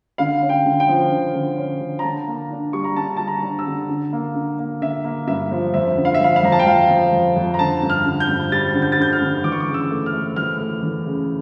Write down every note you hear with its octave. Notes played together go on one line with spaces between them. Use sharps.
D3 F5
C#4
G5
D3
G5
F3
D3
D3
C#4
D3
A#5
D3 A5
A#3
D4
G3 C#6
A#5
D3 A5
G3 A5
A#5
D4
E6
D3
D3
A#3
D3
A#3
D3 E5
A#3
G2 E5
F3
F2 E5
D3
F5
E5
F2 F5
F5
F2 A#5
A5
G5
F2 F5
F3
F2
F2
A#5
D3 A5
G2
F6
D3
G6
G2
G3 A6
D3
G6
A6
D3 G6
F6
D3
E3 D6
C#6
D6
C#3
E6
A3
F6
A3
E3 F6
A3
E3
C#3